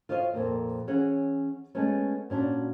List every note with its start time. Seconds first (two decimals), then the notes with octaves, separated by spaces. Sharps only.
0.09 F4 C5 C#5 D#5 F5
0.33 F2 A#2 A#3 C4
0.87 E3 C#4 G#4 F#5
1.75 G#3 A3 B3 C#4
2.30 A#2 C#4 D4 F#4